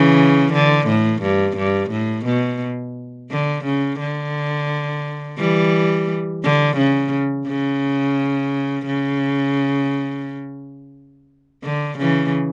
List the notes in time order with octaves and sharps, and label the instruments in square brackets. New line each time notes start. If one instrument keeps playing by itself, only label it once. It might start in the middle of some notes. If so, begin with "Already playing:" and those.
Already playing: [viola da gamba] C#3 E3
D3
A2
G2
G2
A2
B2
D3
C#3
D3
E3 G3
D3
C#3
C#3
C#3
D3
C#3 E3